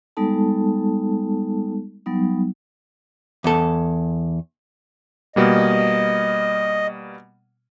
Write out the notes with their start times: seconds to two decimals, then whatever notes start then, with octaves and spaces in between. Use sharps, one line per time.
0.17 G3 G#3 B3 D#4 A4 A5
2.06 F#3 G3 B3 D#4
3.44 E2 A4
5.36 B2 G3 A#3 D#5